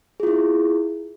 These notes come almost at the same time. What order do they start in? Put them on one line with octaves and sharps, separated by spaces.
G#4 F4 E4